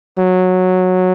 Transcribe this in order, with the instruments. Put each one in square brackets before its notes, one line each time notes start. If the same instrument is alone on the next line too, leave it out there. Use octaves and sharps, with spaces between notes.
[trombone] F#3